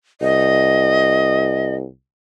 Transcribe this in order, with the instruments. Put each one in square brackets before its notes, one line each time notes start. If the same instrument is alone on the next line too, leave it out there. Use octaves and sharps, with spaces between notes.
[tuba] C2 [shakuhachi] D#5